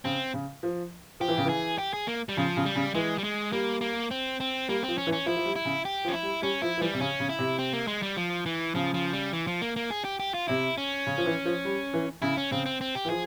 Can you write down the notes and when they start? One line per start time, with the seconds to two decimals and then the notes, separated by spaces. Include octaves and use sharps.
0.05 C#3 C4
0.34 C#3
0.63 F3
1.20 F3 G4
1.28 E3
1.38 C#3
1.45 E3 G#4
1.78 G4
1.94 G#4
2.07 A#3
2.29 G3
2.37 C#3 F3
2.57 C#3
2.65 G3
2.75 C#3
2.95 E3 G#3
3.18 G3
3.24 G#3
3.52 G3 A#3
3.81 A#3
4.11 C4
4.40 C4
4.68 G3 A#3
4.83 C4
4.88 F3
4.98 C#4
5.07 E3
5.13 C#4
5.26 F3 E4
5.37 F3
5.46 G3
5.56 E4
5.65 C#3
5.85 G4
6.05 F3
6.08 C#4
6.14 E4
6.23 G3
6.42 G3 C#4
6.62 F3 E4
6.77 F3
6.81 E3 G3
6.94 C3
7.00 C#3 C#4
7.20 C#3
7.29 E4
7.39 C3
7.59 C4
7.73 A#3
7.87 G#3
8.02 G3
8.17 F3
8.46 E3
8.75 C#3 F3
8.94 F3
9.13 G3
9.33 E3
9.47 F3
9.62 A#3
9.76 A#3
9.91 G#4
10.05 G4
10.20 G4
10.34 F4
10.48 C3 E4
10.78 C#4
11.07 C#3
11.18 F3
11.26 E3
11.45 F3
11.65 G3
11.93 E3
12.22 C#3 E4
12.37 C#4
12.52 C#3 C4
12.66 C4
12.81 C4
12.95 G4
13.05 E3
13.10 F3 G#4